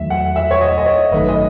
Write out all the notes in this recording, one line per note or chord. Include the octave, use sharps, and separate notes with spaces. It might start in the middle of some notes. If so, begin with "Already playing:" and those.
Already playing: E2 D#3 F#3 A3 E5
F#5
E5
C#5
D#5
D#5
C#5
G#1 F#2 D#3 A3 D#4 B4
D#5